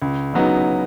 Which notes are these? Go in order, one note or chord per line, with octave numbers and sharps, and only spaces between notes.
C#2
C#3 F#3 B3 D#4